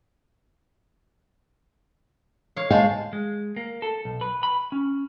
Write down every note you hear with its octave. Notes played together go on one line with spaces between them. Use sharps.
C#5 F5
G#3 C5 F5 A5
G#3
A#3
A4
B1
B4
B5
C#4